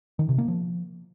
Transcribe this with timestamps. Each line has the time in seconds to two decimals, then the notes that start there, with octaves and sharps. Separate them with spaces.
0.19 D#3
0.29 C3
0.38 A#3
0.48 F3